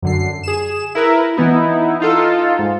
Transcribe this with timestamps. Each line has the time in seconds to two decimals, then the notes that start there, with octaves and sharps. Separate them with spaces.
0.02 F#2 D3 C7
0.43 G#4 E7
0.95 E4 A#4 B4
1.37 E3 B3 D#4 E4
2.00 D#4 F4 A4
2.59 G#2